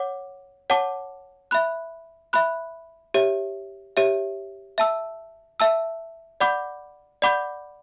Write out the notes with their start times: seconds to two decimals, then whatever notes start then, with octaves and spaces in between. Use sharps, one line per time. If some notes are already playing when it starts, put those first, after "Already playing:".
Already playing: C#5 F#5 D6
0.70 C#5 F#5 A5 D6
1.51 E5 B5 F#6
2.33 E5 B5 F#6
3.14 G4 C#5 E5
3.97 G4 C#5 E5
4.78 E5 A5 E6
5.60 E5 A5 E6
6.40 D5 F#5 B5 D6 G6
7.22 D5 F#5 B5 D6 G6